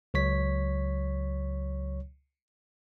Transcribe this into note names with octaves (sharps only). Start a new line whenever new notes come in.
C#2 F#3 C#5 B6